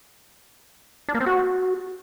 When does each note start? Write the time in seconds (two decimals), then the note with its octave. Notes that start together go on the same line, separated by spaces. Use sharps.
1.09 D4
1.14 A#3
1.20 C4
1.26 F#4